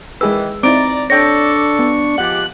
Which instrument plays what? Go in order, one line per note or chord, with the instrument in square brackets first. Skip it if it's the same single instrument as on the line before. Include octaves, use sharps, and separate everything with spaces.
[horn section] D#3 E3 [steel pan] G#3 G#4 B4 [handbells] E6
[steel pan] C4 D#4 E4 [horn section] D5 A#5 [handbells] D6 D7
[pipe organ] D4 C#6 [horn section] A4 D5 [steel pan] C#5 G5 [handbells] A#6
[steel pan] B3
[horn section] F3 G#3 G4 [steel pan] F#5 [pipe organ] F#6